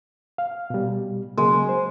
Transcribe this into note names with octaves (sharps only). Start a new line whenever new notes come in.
F5
B2 G3
C#3 F#3 G#3 A#3
C5